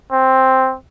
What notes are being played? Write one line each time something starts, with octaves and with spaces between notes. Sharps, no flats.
C4